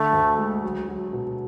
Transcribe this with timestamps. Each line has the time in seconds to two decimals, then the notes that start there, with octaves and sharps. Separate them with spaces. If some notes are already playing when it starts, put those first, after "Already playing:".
Already playing: D3 A3
0.13 D2
0.38 G#3
0.63 F#3
0.88 F#3
1.13 B2